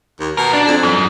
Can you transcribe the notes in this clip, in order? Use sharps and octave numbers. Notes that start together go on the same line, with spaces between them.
D#2
B1 B2 A#4
D4
F2
F#2